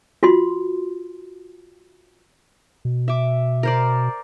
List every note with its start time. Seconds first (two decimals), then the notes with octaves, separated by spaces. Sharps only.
0.23 F4 F#4 C6
2.85 B2
3.08 E5 D6
3.63 A#4 C5 D5